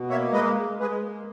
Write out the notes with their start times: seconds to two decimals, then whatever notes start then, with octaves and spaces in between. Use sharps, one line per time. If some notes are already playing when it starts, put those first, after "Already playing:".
Already playing: B2
0.10 A#3 C#5 E5
0.32 G#3 B4 D#5
0.56 G#3
0.79 G#3 G#4 B4
1.03 A#3